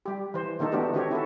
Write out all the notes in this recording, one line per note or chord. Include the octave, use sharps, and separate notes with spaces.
G3 G4
E3 C5
D3 D#3 A#3 D#4 A4
E3 A3 B3 D4 F#4 G4
D3 D#3 C4 F#4 G4 C#5
E4 F#4 A4